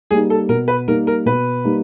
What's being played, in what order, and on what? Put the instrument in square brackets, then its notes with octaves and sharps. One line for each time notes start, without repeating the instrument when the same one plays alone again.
[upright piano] G3 A#3 D#4 [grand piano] G#4
[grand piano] A4
[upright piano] B2 [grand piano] A#4
[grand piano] B4
[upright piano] G3 A#3 D#4 [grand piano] A#4
[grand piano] A#4
[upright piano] B2 [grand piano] B4
[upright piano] G3 A#3 D#4